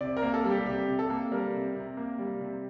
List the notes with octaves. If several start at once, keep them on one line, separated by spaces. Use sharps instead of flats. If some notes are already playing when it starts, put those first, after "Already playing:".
C3 D5
A#4
A#3
A4
G3
G4
C3 G4
C3
A4
A#3
G3 A#4
C3
C3
A#3
G3
C3